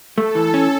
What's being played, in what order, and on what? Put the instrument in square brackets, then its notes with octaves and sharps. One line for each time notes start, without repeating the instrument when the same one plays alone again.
[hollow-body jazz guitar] A3 [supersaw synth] A4
[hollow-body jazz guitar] E3
C#4